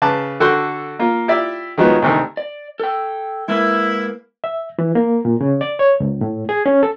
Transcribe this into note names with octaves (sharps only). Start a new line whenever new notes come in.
C#3 B4 A5 D6
D3 F#4 A4 F#5 G5 C6
A#3 F4
E4 F4 G4 D5 E5
D#3 F3 F#3 G#3 B3
D2 C3 D#3
D5
A4 G5
G#3 A#3 E4 B4
E5
E3
A#3
A#2
C#3
D5
C#5
C#2
A2
G#4
C#4
A4